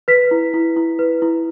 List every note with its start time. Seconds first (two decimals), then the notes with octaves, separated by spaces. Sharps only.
0.08 B4 B6
0.31 E4
0.54 E4
0.76 E4
0.99 B4
1.22 E4